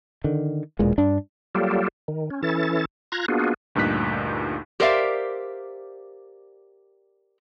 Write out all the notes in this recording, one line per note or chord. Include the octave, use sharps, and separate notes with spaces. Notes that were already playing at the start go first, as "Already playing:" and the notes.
D3 D#3
E1 E2 A#2 G#3
G2 D4
F#3 G3 A#3 F4 G4 A4
D#3
C#4
E3 C#4 E4 A4 A6
F4 A#5 F#6 G#6 A#6
A#3 B3 D4 F4 F#4 G#4
D2 G2 A#2 D#4 F#6 B6
G4 A#4 C5 D5 E5 F5